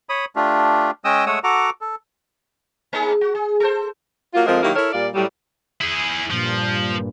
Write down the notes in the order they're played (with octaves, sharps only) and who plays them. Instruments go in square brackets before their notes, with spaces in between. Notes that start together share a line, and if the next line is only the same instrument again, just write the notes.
[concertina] C#5 B5 D#6
A3 D4 F4 G4
G#3 C#4 D#5 G5 D#6 E6
G#3 A3 C#5 F#5 D#6 E6
F#4 A4 F#5 A#5 D6
A4
[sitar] A#3 D#4 G#4
F#4
G#4
A4 C5
[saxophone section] F#3 A#3 F4
F2 F3 G#3 C4 A#4
D#3 F#3 A#3 E4 G4
E4 A4 A#4 C#5
A#2 G3 F4 D5
A2 F#3 G3
[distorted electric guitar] E4 G#4
[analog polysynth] G2 A#2 [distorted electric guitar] F3